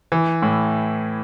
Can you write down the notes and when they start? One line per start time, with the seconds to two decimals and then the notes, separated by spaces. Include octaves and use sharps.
0.12 E3
0.42 A2